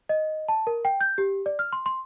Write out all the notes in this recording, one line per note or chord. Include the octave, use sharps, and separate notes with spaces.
D#5
A5
A#4
G5
G6
G4
D5
F6
C6
C6